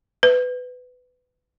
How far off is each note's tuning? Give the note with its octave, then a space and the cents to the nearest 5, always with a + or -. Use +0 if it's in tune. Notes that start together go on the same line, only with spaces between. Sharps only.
B4 +20